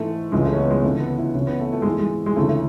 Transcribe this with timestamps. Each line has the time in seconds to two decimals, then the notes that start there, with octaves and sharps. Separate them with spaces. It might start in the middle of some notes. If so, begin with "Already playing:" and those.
Already playing: G#2 E3 A3
0.32 C#2 C#3 E3 G#3
0.45 A3
0.53 C#4
0.58 B3
0.71 G#3
0.83 D2 C#3 E3 A3
1.00 B3
1.18 E4
1.34 C#2 C#3 E3 C#4
1.47 B3
1.60 A3
1.72 A3
1.82 G#2 E3 G#3
1.99 G#3
2.26 G#3
2.36 D2 C#3 E3 A3
2.49 A3